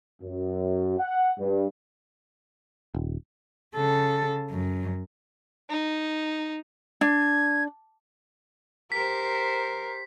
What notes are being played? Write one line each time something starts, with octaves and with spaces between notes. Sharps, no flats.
F#2
F#5
G2
D#1
C#3 A4
F#2
D#4
D4 G#6
G4 A#4 C5 B6